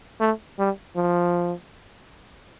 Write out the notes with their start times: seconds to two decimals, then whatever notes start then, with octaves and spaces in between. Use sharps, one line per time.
0.21 A3
0.59 G3
0.96 F3